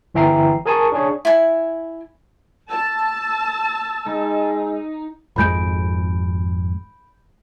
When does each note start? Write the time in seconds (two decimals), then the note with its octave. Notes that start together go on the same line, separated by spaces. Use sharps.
0.14 G1 E3 E5 G5 A#5 C7
0.66 G#4 A#4 G#5 A5 C#6 D#6
0.92 D4 G#4 C#5
1.25 E4 G#5
2.70 A5 E6
4.06 G#3 D#4
5.36 G#1 F2 G#3 B5 G6 D7